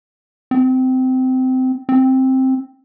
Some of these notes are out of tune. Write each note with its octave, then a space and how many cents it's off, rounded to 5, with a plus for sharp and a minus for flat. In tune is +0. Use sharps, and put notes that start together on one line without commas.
C4 -20
C4 +5